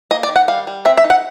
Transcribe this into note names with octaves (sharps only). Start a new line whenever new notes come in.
A#3 D#5
D5
D#3
F#5
G3 F5
G3
C4 E5
E5
D#4
F#5